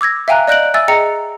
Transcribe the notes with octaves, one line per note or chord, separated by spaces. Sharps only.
D6 E6 G#6 A#6
E5 F5 G5 G#5 A#5 F#6
D5 D#5 F#6 G6 D7 F#7
E5 G#5 E6 A6
G#4 D#5 G5 A#5 C#7